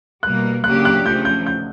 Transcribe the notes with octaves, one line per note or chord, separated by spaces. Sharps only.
B2 G3 A#3 F#6
C#3 F#3 A#3 D4 G4 F#6
F#6
C#3 F3 A3 G6
G6
G6